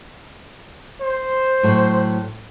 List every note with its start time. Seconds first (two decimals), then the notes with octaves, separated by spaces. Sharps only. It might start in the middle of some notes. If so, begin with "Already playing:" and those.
1.01 C5
1.63 A2 F#3